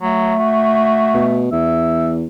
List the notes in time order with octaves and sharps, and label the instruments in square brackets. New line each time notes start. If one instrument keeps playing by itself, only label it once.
[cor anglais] F#3 [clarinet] A3
[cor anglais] F#4
[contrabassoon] B2
[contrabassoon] E2 [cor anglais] E5